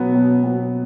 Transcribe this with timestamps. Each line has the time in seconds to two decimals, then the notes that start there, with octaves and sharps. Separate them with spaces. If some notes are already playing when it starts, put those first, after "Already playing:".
Already playing: B2 F#3 B3
0.15 B2
0.44 F#3 B3